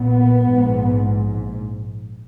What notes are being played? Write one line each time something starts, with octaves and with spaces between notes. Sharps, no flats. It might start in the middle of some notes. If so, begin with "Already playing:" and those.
Already playing: B1 A#2 B3
A#1 G#2